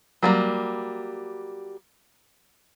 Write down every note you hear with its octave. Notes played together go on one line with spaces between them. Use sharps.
F#3 G3 A#3